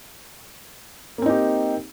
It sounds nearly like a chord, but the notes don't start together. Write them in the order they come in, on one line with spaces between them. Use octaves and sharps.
A#3 C4 D#4 G4